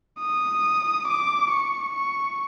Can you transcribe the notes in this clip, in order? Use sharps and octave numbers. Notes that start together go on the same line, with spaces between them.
D#6
D6
C#6
C#6